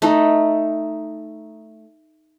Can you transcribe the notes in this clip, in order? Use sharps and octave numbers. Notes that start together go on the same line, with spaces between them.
A3 D#4